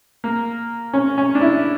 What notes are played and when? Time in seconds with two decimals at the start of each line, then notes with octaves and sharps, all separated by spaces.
0.24 A#3
0.93 C#4
1.18 C#4
1.35 D4
1.41 E4